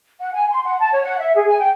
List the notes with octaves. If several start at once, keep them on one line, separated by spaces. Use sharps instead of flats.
F#5
G#5
C6
F#5
A5
C#5
F#5
E5
G#4
G#5
G5